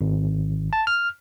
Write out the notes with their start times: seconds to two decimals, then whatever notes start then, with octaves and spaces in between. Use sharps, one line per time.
0.01 G#1
0.73 A5
0.87 F6